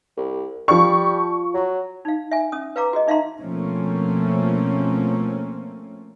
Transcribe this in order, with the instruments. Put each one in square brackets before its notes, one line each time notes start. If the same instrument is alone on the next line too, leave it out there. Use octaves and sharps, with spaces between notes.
[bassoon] C2
[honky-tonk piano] F3 C#6 [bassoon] G3
[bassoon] F#3
[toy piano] D#4 F5
E5 G#5
C#4 D#6
B4 F5 A#5 D6
F#4 G#4 D#5
D#4 E5 F5 A#5 C6
[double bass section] B2 F3 A3 A#3 C4 C#4